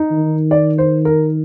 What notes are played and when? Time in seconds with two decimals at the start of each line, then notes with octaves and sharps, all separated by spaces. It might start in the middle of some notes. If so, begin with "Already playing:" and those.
Already playing: D#4
0.11 D#3
0.51 D5
0.78 C5
1.05 A#4